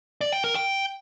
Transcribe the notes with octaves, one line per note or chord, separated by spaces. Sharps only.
D5
G5
A#4
G5